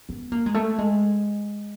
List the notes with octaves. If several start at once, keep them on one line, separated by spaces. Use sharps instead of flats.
B3
A#3
G#3
A3
G#3